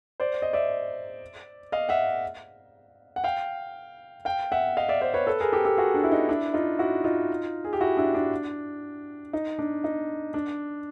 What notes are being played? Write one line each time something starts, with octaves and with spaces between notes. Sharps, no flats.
C5 D5
D#5
D5 E5
D#5 F5
E5 F#5
F#5
F5 G5
F5 G5
E5 F#5
D#5 F5
D5 E5
C5 D5
B4 C#5
A4 B4
G#4 A#4
G4 A4
G4 A4
F#4 G#4
D4
E4
D#4
D4 E4
D#4 F4
E4 F#4
D#4 F4
G#4
G4
E4 F#4
D4 E4
D4
D#4
D4
D#4
D4